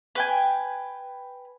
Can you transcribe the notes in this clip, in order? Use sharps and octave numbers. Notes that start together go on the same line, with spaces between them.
B4 G5 G#5